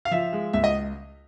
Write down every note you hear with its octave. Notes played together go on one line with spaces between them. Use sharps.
F5
F3 E5
G#3
C#2 E5
D#5